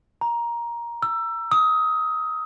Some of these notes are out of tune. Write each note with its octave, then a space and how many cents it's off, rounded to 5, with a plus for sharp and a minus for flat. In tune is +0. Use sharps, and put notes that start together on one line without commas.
A#5 +15
E6 +20
D#6 +25